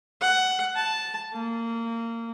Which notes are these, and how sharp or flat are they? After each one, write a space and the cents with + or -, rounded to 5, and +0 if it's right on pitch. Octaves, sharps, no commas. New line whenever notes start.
F#5 +15
A5 -5
A#3 -20